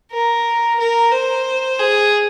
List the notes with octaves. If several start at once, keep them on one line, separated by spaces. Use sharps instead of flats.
A#4
A#4
C5
G#4